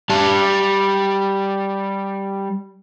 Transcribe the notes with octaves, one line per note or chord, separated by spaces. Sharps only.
G3 A5